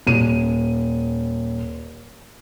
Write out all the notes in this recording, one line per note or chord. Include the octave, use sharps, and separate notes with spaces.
D#1 D#7